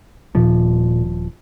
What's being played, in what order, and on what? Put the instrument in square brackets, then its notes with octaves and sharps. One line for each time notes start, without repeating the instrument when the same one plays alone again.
[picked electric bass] D#1 F3 [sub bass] A#2